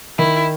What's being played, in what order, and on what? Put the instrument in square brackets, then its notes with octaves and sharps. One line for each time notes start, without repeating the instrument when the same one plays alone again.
[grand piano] D#3 [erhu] E4